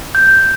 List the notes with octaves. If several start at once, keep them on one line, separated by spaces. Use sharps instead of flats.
G6